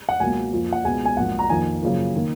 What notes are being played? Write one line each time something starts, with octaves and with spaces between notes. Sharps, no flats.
F#5
C#2 B2 F#3 A#3 G#5
F2 F3 A#3
F#5
C#2 B2 G#3 B3 G#5
G#5
A#1 G#2 F#3 A#3 F#5
A#5
F2 D#3 A#3 G#5
F#2 C#3 F3 A#3
D#3 A#3